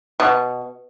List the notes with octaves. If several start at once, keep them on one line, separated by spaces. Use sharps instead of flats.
B2